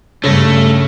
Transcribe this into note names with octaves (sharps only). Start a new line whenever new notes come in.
G2 C#3 G3 A3 C#5 A#6